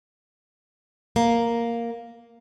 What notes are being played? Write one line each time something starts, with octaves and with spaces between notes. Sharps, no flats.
A#3